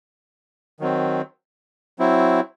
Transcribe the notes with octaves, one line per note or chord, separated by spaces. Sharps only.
D#3 F#3 C4
F#3 C4 E4